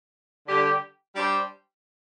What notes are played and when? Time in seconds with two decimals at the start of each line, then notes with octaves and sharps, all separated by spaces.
0.47 D3 G3 D4 G4
1.14 G3 D4 G4 C5